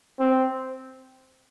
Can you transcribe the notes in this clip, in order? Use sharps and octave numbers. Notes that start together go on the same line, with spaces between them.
C4